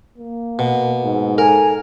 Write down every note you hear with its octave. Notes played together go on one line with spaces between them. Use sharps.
A#3
B2
G#2
A4 A#4 G#5